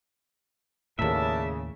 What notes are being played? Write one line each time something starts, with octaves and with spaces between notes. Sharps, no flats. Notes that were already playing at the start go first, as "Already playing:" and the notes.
D#2 A2 C#3 D4 A#4 E5 A5